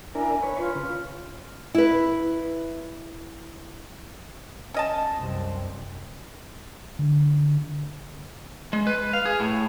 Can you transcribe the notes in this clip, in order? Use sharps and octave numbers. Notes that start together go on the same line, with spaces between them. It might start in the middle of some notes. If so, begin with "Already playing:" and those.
D4 E4 A#4 G#5
B4 C#5
F4
C#3
E4 B4
C#4 D#5 A5
C2 F#2 C4
D3
G#3
B4
F5
G#4
A2